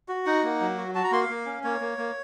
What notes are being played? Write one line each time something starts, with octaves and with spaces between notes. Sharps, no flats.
F#4
D#4 F#5
A#3
F#3
F#4
F#4 A5
A#5
A#3 C6
F5
A#3
C#4
A#3 C#5
A#3
A#3